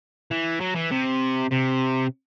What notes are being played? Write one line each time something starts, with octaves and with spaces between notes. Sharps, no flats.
E3
F#3
E3
C3
C3